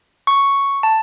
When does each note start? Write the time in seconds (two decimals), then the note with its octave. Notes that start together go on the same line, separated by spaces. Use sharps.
0.27 C#6
0.83 A5